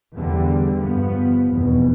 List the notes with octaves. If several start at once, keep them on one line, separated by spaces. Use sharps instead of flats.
E2 D3 G3
G2 F3 B3
F1 E2 B2